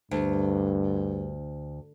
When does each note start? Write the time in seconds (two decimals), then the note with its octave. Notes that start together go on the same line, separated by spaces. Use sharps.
0.11 D2 G2